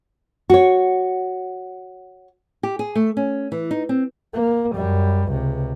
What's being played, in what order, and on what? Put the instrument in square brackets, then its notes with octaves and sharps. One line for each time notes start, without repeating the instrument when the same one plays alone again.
[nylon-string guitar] F#4 C#5
G4
G#4
A3
C#4
E3
D#4
C4
[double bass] A#3
F#2 G3
C#2 C3